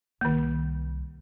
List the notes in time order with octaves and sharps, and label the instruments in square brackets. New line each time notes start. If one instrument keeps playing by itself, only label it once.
[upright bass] C2 [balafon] D#3 A#3